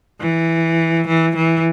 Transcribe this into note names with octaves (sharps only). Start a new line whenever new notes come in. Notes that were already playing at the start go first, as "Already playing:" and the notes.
E3
E3
E3